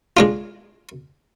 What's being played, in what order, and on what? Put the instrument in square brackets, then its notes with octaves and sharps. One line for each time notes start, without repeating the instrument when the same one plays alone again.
[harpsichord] G#3 D4 F4